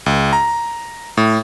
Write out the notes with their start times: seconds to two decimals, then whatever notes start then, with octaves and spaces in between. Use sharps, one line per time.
0.06 C#2
0.33 A#5
1.17 A2